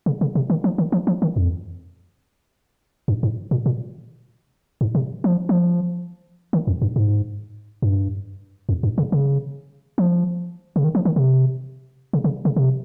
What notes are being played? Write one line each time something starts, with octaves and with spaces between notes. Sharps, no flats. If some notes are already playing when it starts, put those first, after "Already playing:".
C#3
C#3
C3
D#3
F3
D#3
F3
F3
D#3
F2
G2
G#2
A#2
A#2
G#2
C3
F3
F3
D#3
F2
G2
G#2
G2
F2
G2
C#3
C#3
F3
C#3
D#3
F3
D#3
C3
C#3
C#3
C#3
C3